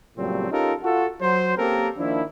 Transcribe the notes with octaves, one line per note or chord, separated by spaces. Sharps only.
A#2 C#3 F#3 G3 A3 C4
C#4 D#4 F4 G4 A4 A#4
F4 F#4 A4
F#3 C5
A#3 C4 C#4 G4 A4 A#4
D#3 F3 A#3 D4 E4